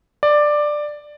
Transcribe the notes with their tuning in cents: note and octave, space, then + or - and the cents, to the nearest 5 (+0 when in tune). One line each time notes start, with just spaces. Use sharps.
D5 +10